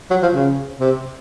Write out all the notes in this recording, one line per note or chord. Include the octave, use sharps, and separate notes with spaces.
F#3
F3
C#3
C3